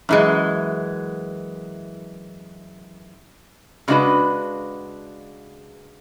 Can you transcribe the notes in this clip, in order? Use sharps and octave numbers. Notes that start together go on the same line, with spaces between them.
F#2 E3 G#3
C#3 G#3 D4 F#4 B4